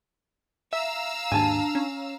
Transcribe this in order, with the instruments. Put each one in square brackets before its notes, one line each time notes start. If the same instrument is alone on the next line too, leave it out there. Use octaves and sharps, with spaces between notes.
[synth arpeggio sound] E5 [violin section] F5 A#5 E6
[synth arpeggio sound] D#2 G#2 [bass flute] D4 [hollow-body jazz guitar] G#5 A5
[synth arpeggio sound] C#4